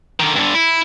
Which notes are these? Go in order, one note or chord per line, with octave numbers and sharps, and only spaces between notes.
D3 D#3
G2 D3
E4